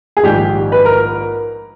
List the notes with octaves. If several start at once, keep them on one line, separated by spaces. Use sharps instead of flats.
G#4
A#1 G#2 D#3 G4
B4
A#4